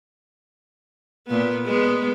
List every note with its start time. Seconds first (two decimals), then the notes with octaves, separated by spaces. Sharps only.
1.28 A#2 B3
1.65 G#3 B3